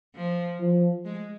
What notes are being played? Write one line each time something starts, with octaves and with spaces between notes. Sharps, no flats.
F3
F3
G#3